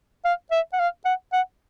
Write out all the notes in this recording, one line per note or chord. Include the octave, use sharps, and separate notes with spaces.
F5
E5
F#5
F5
F#5
F#5